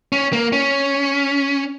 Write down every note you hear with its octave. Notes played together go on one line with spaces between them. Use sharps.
C#4
A#3
C#4